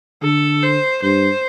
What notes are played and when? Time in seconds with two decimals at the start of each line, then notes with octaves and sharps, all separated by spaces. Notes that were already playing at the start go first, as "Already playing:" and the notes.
0.23 D3 A4
0.63 C5
1.02 G2 C5